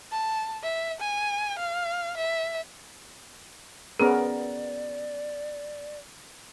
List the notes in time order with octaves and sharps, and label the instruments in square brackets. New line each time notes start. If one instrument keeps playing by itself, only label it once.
[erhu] A5
E5
G#5
F5
E5
[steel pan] B3 C#4 A#4 [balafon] G#4 [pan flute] D5